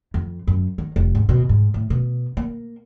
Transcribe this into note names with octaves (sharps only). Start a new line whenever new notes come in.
F2
F#2
D#3
F1
G#2
B2
G#2
A2
B2
A#3